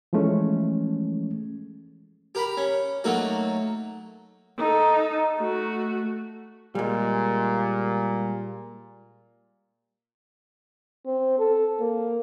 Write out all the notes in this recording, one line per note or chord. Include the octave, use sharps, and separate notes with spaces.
E3 F3 G#3 A3 C#4
G4 A#4 B5
C#4
F#3 A3 A#3 D#4 F#4
D#4 A4
A3 F#4
A#2 G3 G#3
C4
A4
A#3